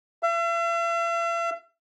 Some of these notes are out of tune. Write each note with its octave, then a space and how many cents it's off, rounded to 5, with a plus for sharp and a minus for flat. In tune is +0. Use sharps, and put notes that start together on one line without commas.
E5 +45